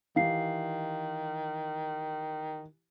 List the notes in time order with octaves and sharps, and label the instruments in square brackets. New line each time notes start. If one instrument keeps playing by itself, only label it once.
[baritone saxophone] D#3 [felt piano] E3 G4 [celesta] F5 C7